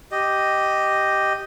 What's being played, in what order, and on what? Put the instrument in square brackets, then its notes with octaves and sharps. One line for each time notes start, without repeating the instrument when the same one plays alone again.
[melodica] G4 D#5